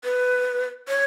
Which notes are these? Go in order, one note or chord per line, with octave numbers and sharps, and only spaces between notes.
B4
C#5